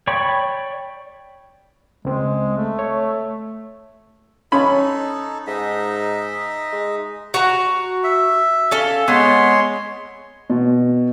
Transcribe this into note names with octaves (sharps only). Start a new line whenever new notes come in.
C#5 D5 G5 B5 C#6
C#2 G#3 C4
A3
C#5
C#4 D#4 A4 B5
G#2 D#4 D#5 E5
G#3
F#4 A#5
E5
C#4 A4 F5
G#3 B3 C#5 C6
B2